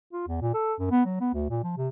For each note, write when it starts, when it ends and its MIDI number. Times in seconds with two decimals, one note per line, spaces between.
0.12 0.23 65
0.27 0.38 40
0.42 0.51 46
0.54 0.74 69
0.79 0.89 42
0.91 1.03 59
1.06 1.17 54
1.21 1.31 59
1.34 1.48 38
1.50 1.62 46
1.64 1.74 53
1.77 1.88 48